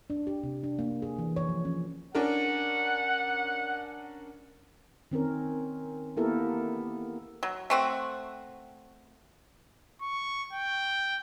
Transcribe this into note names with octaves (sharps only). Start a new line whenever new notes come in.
D4
G4
C3
D4
A#3
G#4
E3
C#5
F3
C#4
C#4 D4 A#4 F#5
D#3 C4 C#4 A#4
A#3 B3 E4 G4 A4 A#4
F#3
A3 C4 F#4
C#6
G5